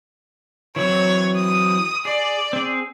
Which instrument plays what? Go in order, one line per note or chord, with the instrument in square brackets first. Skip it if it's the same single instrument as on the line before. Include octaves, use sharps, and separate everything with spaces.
[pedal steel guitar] E3 F#3 C4 [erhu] C#5
[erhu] D#6
[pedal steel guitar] G#4 [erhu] D5
[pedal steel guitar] C4 G#4